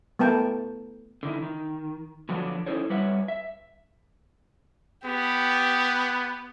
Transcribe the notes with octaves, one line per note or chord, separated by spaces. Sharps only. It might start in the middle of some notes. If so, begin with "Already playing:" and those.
A3 B3 A#4 G5 A5
D3 D#3 E4
D#3
B2 D3 F3 F#3 B3 D4
C#4 D#4 E4 A4 C5 C#5
G3 B4 C#5 E5 F#5
E5
B3 G4